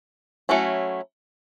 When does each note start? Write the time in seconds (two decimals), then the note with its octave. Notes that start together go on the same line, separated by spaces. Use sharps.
0.49 F#3 A3 C#4 E4